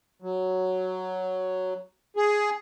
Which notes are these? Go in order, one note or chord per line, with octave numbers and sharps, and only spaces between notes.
F#3
G#4